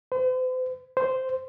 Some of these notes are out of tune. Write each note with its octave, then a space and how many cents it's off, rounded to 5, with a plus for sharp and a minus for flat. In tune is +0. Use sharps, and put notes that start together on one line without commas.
C5 -45
C5 -10